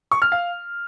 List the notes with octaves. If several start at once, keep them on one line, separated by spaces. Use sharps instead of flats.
C#6
F6
F5